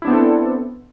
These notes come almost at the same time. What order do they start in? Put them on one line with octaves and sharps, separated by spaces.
E4 D4 B3 C4 A4